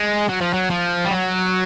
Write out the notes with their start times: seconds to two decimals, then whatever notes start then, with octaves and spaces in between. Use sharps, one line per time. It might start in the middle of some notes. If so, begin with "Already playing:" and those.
Already playing: G#3
0.29 F#3
0.41 F3
0.53 F#3
0.70 F3
1.05 G3
1.11 F#3